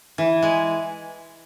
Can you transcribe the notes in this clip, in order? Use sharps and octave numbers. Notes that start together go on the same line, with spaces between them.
E3
G#3